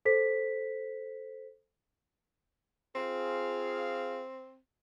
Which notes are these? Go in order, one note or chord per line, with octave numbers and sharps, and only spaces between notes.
A4 C5 B6
C4 F4 G#4 F5